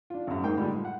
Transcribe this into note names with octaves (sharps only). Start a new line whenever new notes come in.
D4 F4
G#1 F#2
G#2 G#3 A#3 D#4 G5
A2 D3 F3 G3 G#3
F3
F#5